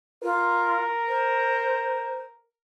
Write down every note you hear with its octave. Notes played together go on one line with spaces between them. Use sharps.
F4 A#4
C5